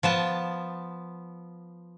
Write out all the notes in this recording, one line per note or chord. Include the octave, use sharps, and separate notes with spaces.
F3 B3 A5